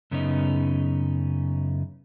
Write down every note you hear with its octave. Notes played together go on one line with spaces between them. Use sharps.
F#2 C#3 B3 C#4 D#4